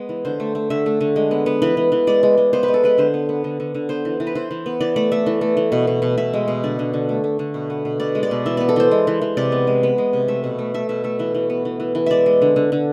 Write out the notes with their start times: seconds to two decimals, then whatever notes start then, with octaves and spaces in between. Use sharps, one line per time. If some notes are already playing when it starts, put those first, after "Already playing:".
Already playing: G#3 B3
0.09 E3
0.25 D3 C5
0.40 A3
0.55 A3
0.70 D3 E5
0.86 A3
1.01 D3
1.16 G#3
1.31 B3
1.46 B3
1.62 E3 B4
1.77 E3
1.92 E3
2.07 G#3 D5
2.23 G#3
2.38 G#3
2.53 B3 C5
2.63 B4
2.68 G#3
2.74 A4
2.84 G#3 B4
2.98 D3 C5
3.14 B3
3.29 B3
3.44 D3
3.60 D3
3.75 D3
3.89 B3 C5
4.05 E3
4.20 E3
4.27 B4
4.35 E3 C5
4.51 E3
4.66 B3
4.81 E3 D5
4.96 A3 D5
5.12 A3 E5
5.26 E3
5.41 A3
5.57 E3
5.72 B2
5.87 B2
6.02 B2
6.18 B2 E5
6.34 G#3
6.48 B2
6.64 D3 D5
6.79 D3
6.94 D3
7.09 A3
7.24 A3
7.39 D3
7.54 B2
7.70 B3
7.85 B2
8.00 B2 D5
8.15 G#3
8.23 D5
8.31 B2
8.46 E3 E5
8.57 B3 D5
8.69 A4
8.76 E3 C5
8.91 G#3
9.07 E3
9.22 E3
9.37 C3 D5
9.52 B3
9.67 G#3
9.83 B3
9.98 G#3
10.13 C3
10.28 A3 E5
10.44 B2
10.59 A3
10.74 A3 E5
10.89 B2 E5
11.04 A3 E5
11.19 E3 E5
11.35 E3
11.50 B3
11.65 E3
11.80 E3
11.95 E3
12.06 G#3 D5 E5
12.26 G#3
12.41 D3
12.56 D3
12.72 D3